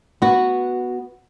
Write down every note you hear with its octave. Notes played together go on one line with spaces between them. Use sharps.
B3 F#4